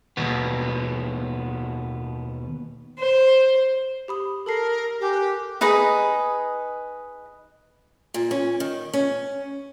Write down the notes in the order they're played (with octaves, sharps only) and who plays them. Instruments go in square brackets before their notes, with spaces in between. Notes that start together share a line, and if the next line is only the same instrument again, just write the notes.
[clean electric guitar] D#2 B2 B3
[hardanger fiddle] C5
[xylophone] G4 B5 D#6
[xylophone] A4 A5 C7 [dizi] A#4
[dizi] G4 [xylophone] A#4 G#5 D6
[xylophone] F#6
[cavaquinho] D#4 G#4 B4 D#5
[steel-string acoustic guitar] A#2
C#4
D#3
C#4